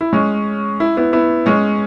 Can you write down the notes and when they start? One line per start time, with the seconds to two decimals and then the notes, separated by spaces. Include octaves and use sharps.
0.01 E4
0.13 G#3 C#4
0.80 E4
0.97 B3 E4
1.13 B3 E4
1.46 G#3 C#4